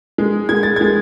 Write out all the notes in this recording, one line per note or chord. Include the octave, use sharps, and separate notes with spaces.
G#3
G#3 G#6
A6
G#3 G#6